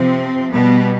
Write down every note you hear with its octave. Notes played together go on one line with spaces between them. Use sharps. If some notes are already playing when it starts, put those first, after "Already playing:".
Already playing: C3 F3 C4
B2 G3 B3